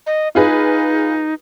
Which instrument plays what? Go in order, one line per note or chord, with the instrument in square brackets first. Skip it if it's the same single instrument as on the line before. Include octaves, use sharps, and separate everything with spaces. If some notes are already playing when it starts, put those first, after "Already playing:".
[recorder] D#5
[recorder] D#4 [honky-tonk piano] F4 G#4 B4